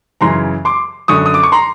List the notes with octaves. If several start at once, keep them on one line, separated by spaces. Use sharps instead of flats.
F#2 C#3 E3 A#5 C6
C6 D6
F#2 D3 C#6 D#6
D#6
D6
C#6
A#5 C6